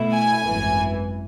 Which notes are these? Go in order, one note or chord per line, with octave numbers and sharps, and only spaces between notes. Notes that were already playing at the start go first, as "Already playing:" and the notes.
Already playing: B2 A3 E4
G#5
G#1 F#2 E3